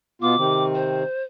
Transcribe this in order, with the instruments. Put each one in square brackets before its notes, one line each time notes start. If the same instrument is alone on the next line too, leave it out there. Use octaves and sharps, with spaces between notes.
[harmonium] B2 B3 F4 [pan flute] D6
[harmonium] C3 D#3 C4
[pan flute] C5